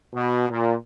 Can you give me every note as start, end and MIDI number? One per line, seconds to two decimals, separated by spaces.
0.14 0.46 47
0.50 0.75 46